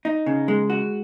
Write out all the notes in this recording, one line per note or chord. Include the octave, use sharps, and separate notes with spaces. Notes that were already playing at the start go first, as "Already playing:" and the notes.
D#4
C#3
G#3
F#4